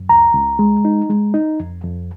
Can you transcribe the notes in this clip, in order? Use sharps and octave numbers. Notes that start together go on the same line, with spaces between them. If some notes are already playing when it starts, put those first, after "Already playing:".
Already playing: F#2
C#2 A#5
C#2
G#3
D#4
G#3
D#4
F2
F2